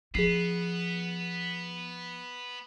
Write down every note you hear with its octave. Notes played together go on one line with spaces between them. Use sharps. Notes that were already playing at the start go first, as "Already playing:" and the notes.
F3 B3 G#4 C7